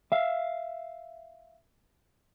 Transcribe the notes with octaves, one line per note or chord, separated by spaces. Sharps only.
E5 F5